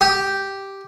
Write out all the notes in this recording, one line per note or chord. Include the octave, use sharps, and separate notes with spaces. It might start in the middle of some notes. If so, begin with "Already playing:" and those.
G4